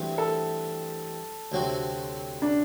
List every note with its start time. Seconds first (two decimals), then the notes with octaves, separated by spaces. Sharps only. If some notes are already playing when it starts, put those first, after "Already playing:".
Already playing: G2 E3 A3 C4 F#4
0.18 A4
1.52 D2 C3 F#3 C4 F#4
2.42 D4